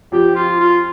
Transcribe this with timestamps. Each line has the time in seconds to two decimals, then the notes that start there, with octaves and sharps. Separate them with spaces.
0.12 F2 F3 G4
0.36 F4
0.60 F4